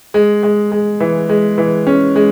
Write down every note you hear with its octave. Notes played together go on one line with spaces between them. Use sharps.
G#3
G#3
G#3
E3
G#3
E3
C#4
G#3